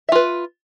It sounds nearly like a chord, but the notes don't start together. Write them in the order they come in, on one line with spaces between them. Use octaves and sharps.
E5 F4 B4